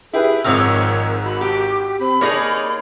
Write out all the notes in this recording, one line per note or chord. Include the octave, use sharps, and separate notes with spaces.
E4 G4 G#4 B4
G#1 G#2 D#3 F3 C4 A#4 C#5 E6
F#4 B5
G4 D6
C4 B5
A#3 D#4 G#4 A#4 C#5 D5 A#6